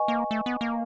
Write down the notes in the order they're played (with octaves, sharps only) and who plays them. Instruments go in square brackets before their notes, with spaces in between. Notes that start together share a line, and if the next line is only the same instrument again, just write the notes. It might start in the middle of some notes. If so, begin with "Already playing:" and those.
Already playing: [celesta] B4 D#5 G#5 C#6
[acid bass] A#3
A3
B3
A#3